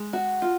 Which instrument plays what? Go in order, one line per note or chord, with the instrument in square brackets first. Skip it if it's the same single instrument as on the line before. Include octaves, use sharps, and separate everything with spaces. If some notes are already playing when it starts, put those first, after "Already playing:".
Already playing: [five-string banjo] G#3
F#4
F4